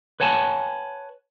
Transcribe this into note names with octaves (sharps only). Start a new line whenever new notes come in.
B4 C#5 F#5 G#5 A5